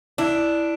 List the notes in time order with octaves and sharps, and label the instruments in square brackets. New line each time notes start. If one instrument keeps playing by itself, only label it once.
[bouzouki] D4 [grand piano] E4